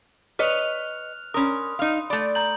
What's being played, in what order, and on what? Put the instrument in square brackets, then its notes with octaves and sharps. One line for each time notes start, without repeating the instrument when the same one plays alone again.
[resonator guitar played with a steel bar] B4 C#5 D#5 [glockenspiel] F6 F#6 F7
[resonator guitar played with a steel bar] C#4 A#4 [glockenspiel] B5 C6 D#6
[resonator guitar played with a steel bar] D#4 F5
[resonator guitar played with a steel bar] A3 D5 [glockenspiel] B5
[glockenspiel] A#5 G6 F#7